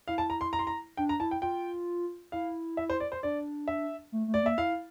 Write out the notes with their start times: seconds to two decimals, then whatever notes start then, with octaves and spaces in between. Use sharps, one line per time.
0.08 E4 F5
0.18 A5
0.30 A#5
0.41 C6
0.53 A#5
0.59 C6
0.67 A#5
0.97 D4 G5
1.09 A#5
1.20 E4 A5
1.31 G5
1.42 F4 G5
2.32 E4 F5
2.77 E5
2.90 C5
3.00 D5
3.12 C5
3.23 D4 D5
3.68 E5
4.12 A3
4.28 A3
4.34 D5
4.43 A#3 E5
4.58 E4 F5